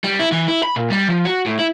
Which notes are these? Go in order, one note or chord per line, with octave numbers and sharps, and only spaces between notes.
G3
E4
E3
E4
B5
A#2
G3
F3
F#4
A2
E4